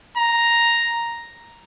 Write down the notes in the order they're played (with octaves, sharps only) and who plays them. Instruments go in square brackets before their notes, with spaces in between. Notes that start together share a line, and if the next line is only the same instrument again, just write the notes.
[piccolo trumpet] A#5